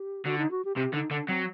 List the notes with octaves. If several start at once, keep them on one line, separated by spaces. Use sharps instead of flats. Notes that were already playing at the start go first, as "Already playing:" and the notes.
Already playing: G4
D3 F#4
D#4
F#4
G4
C3 G4
D3 D#4
D3 D4
F#3 C4